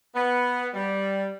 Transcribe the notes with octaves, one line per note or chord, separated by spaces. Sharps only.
B3
G3